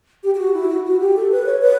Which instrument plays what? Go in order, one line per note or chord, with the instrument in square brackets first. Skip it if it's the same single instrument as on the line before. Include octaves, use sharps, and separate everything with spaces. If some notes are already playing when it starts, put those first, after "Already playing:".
[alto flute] G4
G4
F#4
E4
F#4
F#4
G4
A4
B4
C#5
B4